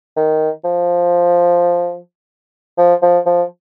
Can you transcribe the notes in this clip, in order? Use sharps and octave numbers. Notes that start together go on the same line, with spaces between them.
D#3
F3
F3
F3
F3